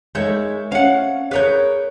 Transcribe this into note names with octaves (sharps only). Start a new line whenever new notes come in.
G#3 D#4 A#4 C#5 E5 G6
A3 C4 C#4 F5 F#5
G#4 A#4 B4 C#5 G6